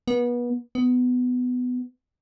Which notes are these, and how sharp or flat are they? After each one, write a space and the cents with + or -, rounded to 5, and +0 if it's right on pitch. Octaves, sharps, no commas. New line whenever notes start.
B3 -30
B3 +15